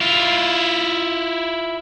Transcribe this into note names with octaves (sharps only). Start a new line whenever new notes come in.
E4 F4